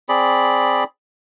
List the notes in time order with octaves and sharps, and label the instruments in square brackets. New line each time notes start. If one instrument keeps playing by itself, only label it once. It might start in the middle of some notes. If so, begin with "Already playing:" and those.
[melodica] C4 G#4 D5 B5